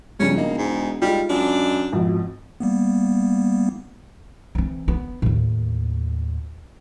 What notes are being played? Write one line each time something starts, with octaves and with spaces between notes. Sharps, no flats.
E1 G2 C#3 F3 C#4
A#3 D#4
G#2
G3 G#3 D#4 F4
F#2 D4
G#1 F2 B2
G3 A#3 B3
E3 C4
B3
D#2 A2